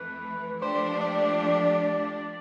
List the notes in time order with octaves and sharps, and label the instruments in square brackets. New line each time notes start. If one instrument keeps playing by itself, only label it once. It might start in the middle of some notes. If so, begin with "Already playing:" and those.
Already playing: [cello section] F2 E3 A3 [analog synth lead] B4
[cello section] F3 A3 D4 G4 [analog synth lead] C5
[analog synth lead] D5